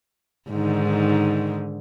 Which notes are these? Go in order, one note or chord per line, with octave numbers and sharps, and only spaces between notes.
G#2 D3 D#3